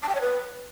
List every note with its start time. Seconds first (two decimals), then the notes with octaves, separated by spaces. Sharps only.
0.03 A5
0.09 G5
0.15 C#5
0.21 B4